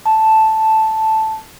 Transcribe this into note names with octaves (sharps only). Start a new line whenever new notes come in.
A5